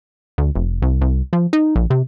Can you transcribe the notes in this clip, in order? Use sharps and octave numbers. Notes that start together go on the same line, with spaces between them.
D2
F1
C2
C2
F3
D#4
A#1
C3